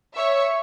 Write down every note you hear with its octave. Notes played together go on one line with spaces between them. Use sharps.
C#5 E5